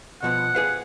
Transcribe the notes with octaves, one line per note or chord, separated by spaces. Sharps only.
B2 F3 B3 F#5
G#4 B4 F5